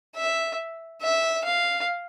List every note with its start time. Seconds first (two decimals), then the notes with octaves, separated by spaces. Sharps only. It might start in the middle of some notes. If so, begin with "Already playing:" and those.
0.16 E5
1.02 E5
1.44 F5